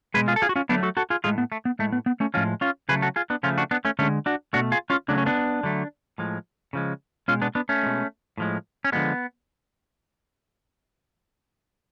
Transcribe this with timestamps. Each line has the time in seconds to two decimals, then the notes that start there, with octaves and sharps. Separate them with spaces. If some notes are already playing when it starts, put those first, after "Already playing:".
0.14 B2 G#3 G#4 B4
0.28 F4 G#4
0.36 A4
0.42 F4 G#4
0.49 F#4
0.56 C#4 F4
0.69 D3 F#3 A3 B3 D4
0.83 F#4 A4
0.97 F#4 A4
1.10 F4 G#4
1.24 A2 G#3 F4 G#4
1.38 B3
1.52 A3
1.65 B3
1.79 A2 G#3 A3
1.93 B3
2.06 B3
2.20 A3 C#4
2.34 A2 F3 G#3 C#4 F4
2.61 C#4 F4
2.89 C#3 F#3 A3 G#4 B4
3.02 F#4 A4
3.16 F4 G#4
3.30 B3 D4
3.43 C#3 F3 A3 C#4 F4
3.58 D4 F#4
3.71 B3 D4
3.85 A3 C#4
3.99 D3 G#3 A3 C#4
4.26 D4 F#4
4.53 B2 A3 D4 F#4
4.72 F4 G#4
4.90 C#4 F4
5.08 C#3 F#3 A3 D4
5.18 C#4
5.26 B3 D4
5.63 D3 F#3 A3
6.18 A2 F3 G#3
6.73 C#3 F3 G#3
7.28 B2 G#3 C#4 F4
7.42 B3 D4
7.55 B3 D4
7.69 A3 C#4
7.83 B2 G#3
8.38 A2 F3 G#3
8.84 C#4
8.92 D3 F3 G#3 B3